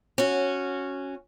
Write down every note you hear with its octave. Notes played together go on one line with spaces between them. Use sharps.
C#4 F#4